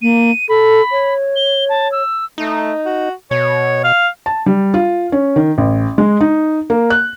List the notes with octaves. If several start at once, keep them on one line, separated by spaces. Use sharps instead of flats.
A#3 D#7
A4 B5
C#5
G7
A5
E6
A3 D#4
F#4
B2 C#5
F5
A5
G3
F4
C#4
D#3
A1
G#3
D#4
A#3
F#6